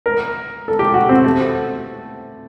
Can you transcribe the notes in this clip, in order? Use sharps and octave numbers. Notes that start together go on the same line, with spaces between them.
A#4
A4
G4
F#4
C4
A3